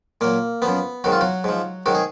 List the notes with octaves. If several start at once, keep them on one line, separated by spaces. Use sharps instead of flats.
A#2 F#3 A#3
F#2 F3 B3
G#2 D#3 F#3 F#4
F4
F#3 F#4
G#2 F3
G#2 D#3 F#3 F#4
G#4